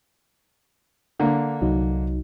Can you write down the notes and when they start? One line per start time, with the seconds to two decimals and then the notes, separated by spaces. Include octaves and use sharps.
1.20 D3 A#3
1.62 C2 F#3 D#4